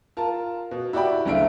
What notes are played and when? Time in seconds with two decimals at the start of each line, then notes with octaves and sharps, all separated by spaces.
0.17 F4 A#4 A5
0.71 B2
0.93 E4 F#4 G4 D5 G5 B5
1.25 F#1 D2 A3 E5 F5 D7